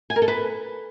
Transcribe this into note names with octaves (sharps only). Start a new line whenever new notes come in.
G#5
A#4
A4
B4